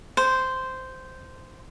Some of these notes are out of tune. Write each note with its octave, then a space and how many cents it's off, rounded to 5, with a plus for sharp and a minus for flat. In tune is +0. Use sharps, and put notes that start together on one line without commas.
C5 -10